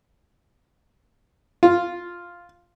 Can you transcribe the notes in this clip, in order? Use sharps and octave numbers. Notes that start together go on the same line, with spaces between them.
F4